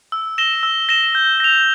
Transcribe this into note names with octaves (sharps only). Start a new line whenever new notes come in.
E6
A#6 E7 G7
E6
A#6 E7 G7
G6
A#6 F7